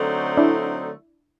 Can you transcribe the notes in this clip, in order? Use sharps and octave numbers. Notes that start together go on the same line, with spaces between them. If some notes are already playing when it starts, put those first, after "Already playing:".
Already playing: D3 F#3 A3 C4 D#4
D4 E4